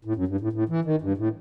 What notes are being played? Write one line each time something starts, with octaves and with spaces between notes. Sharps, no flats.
A2
F#2
G2
A2
A2
E3
D#3
G2
A2